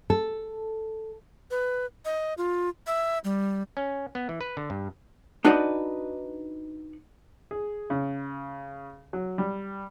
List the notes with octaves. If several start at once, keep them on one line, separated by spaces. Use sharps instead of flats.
A4
B4
D#5
F4
E5
G3
C#4
B3
E3
B4
D3
G2
D4 D#4 F#4 B4 D5 D#5
G#4
C#3
F#3
G3